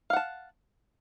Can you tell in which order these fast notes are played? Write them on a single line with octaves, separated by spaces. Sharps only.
F5 F#5 A5